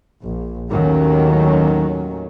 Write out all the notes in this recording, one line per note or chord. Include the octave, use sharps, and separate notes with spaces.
A#1
D#2 A2 D#3 F#3 C#4